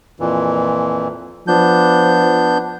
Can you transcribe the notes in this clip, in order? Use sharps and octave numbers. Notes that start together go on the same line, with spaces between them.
F2 A#2 E3
F3 B3 D4 G6